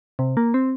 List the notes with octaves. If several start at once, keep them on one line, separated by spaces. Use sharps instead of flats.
C3
A#3
C4